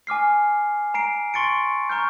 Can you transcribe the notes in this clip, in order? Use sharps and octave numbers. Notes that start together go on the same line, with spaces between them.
G#5 D6 F6 C7
A#5 C7 D7
C6 C#6 A6 C#7 D7
A#5 C#6 F6 G6